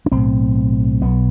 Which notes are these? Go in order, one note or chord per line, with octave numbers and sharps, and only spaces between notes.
D4
B1 A2 C4
B1 B2 B3